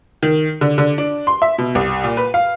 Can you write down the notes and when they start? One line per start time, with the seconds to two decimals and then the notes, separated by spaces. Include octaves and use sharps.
0.23 D#3
0.61 D3
0.78 D3
0.98 D4
1.27 C6
1.42 E5
1.58 B2
1.75 C2
2.04 A#2
2.17 B4
2.34 F5